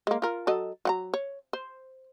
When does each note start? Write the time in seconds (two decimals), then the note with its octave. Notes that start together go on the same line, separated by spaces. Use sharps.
0.07 G#3 A#3
0.22 F4 A#4
0.47 F#3 A4 D#5
0.85 F#3 F#5 A#5
1.14 C#5
1.53 C5